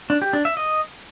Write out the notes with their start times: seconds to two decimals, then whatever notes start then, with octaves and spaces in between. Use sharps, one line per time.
0.10 D4
0.22 G4
0.33 D4
0.45 E5
0.57 D#5